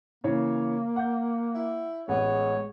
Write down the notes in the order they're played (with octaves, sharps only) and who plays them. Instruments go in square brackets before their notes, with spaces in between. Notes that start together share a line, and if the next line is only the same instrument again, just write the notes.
[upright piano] C#3 E3 C#5 [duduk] A#3
[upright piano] F#5 G6
[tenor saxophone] E4
[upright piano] A1 [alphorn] G#3 [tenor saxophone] B3 [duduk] C#5